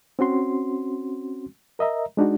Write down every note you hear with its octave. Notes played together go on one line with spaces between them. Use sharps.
C4 C#4 F#4 C6
A#4 D#5 E5 A#5
G#3 D4 D#4 F#4